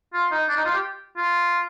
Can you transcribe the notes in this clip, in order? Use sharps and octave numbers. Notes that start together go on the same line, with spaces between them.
F4
D#4
D4
D#4
F4
G4
F4